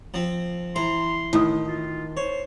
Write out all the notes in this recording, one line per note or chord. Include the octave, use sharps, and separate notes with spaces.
F3 C4
E3 A#5 C6
A2 D#3 D#6
F4
C5 C#5